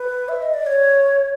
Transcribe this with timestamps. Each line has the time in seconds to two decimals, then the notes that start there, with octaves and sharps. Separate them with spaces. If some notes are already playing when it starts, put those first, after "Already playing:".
Already playing: B4
0.28 E5
0.42 D#5
0.54 D5
0.66 C#5